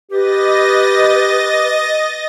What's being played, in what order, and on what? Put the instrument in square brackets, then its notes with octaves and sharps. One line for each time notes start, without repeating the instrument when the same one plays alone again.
[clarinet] G4 [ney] B4 [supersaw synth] D#5 A6 A#6